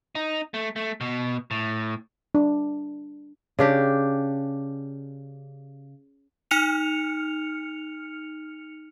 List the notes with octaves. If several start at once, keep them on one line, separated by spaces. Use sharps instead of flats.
D#4
A3
A3
B2
A2
D4
C#3 D4 G4
D#4 F6 C#7 F7